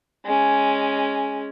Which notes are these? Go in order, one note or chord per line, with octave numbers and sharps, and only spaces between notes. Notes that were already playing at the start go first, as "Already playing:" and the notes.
G#3 C#4